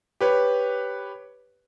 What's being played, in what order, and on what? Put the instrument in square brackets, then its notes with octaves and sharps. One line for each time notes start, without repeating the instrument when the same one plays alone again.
[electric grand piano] G4 B4 C#5